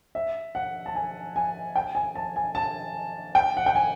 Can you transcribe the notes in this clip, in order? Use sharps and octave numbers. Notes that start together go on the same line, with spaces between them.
E5
F#5
A5
G#5
G#5
G5
G#5
A5
G#5
A5
G5
F#5
G5
G#5